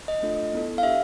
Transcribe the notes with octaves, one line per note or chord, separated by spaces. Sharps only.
D#5
A3 D4 F4 A4
B3 E4 A4
F5
D4 G4 E5